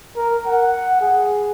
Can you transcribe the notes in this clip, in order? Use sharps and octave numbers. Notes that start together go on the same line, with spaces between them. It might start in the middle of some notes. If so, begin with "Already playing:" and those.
A#4
F#5
G#4